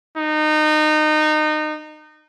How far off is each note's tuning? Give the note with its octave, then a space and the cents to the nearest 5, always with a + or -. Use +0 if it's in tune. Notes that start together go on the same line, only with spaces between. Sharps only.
D#4 -25